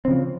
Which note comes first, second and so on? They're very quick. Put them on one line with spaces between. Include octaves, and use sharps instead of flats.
C4 C#3 F3